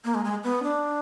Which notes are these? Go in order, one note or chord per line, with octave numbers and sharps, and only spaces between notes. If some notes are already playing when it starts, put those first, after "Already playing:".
A#3
G#3
G#3
B3
D4